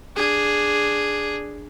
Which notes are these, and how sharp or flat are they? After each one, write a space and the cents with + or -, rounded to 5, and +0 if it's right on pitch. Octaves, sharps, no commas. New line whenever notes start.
D4 +0 G#4 +0